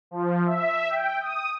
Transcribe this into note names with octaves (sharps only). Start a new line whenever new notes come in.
F3
E5
G5
D#6